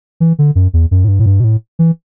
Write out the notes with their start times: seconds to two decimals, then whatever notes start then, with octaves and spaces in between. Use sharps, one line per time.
0.20 E3
0.39 D3
0.55 F#2
0.74 E2
0.91 F#2
1.04 A2
1.08 G2
1.19 A2
1.26 G2
1.40 B2
1.44 A2
1.79 E3